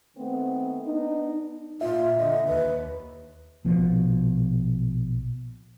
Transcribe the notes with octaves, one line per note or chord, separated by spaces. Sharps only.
D#3 A3 B3 C4
B3 D4 D#4
A#2 F4 E5
D3 D#5
D#2 B4
A#1 B2 F3